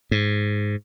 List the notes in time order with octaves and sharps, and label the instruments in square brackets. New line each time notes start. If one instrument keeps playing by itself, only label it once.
[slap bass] G#2